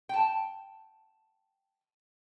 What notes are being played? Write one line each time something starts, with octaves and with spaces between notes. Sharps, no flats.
G5 A5